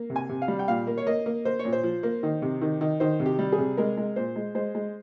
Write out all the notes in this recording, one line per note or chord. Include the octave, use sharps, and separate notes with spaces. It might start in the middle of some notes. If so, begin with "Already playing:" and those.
Already playing: A#3
C3
G#5
C3
F5
G3
G5
A#2 F5
A#3
C#5
A#3 D#5
A#3
A#3 C5
C#5
A#2
C5
F3
A#3
D#3
C3
D#3
D#3
D#3 C5
C3
G4
G3
G#4
C3
G#3 A#4
G#3
A#2 C5
G#3
G#3 C5
G#3